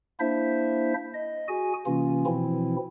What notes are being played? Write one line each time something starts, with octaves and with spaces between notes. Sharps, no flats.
A#3 D4 E4 C5 E5
D#5
F#4 G#4 G#5
C3 E3 A#3 C#4 F4
B2 E3 F3 C4 E4